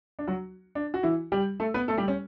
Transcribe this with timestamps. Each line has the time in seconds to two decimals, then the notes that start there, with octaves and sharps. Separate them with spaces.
0.19 D4
0.27 F#3 F#4
0.75 D4
0.94 F#4
1.03 E3 E4
1.32 G3 G4
1.60 A3 A4
1.74 B3 B4
1.88 A3 A4
1.98 G3 G4
2.08 C#4